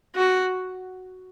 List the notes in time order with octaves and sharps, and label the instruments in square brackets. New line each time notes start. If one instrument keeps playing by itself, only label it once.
[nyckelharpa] F#4